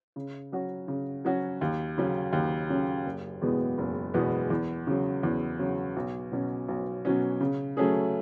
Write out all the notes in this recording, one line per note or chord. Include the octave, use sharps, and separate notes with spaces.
C#3
F#3 C#4 F#4
C#3
F#3 C#4 F#4
D#2
C#3 F#3 C#4
D#2
C#3 F#3 C#4
F#1
E2 B2 G#3 B3
F#1
E2 B2 G#3 B3
E2
C#3 F#3
E2
C#3 F#3
B1
B2 F#3 C#4
B1
B2 F#3 C#4
C#3
F#3 A3 C#4 G#4